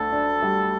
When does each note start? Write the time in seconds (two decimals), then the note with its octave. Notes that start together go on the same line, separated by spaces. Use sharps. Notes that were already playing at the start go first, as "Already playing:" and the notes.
Already playing: D2 D4 A4
0.12 D4
0.42 G3